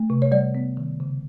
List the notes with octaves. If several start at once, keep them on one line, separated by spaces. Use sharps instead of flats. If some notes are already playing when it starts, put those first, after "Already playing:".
Already playing: A3
C3
C#5
G3 D5
B3
D#3
C#3